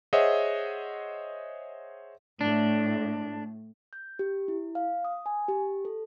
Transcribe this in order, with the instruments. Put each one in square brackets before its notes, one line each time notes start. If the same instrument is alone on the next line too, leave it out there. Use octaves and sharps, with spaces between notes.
[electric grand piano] G#4 C5 C#5 D#5 E5 F#5
[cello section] A2 [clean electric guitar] D4
[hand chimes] G6
G4
E4
F5
D#6
G#5
G4
A4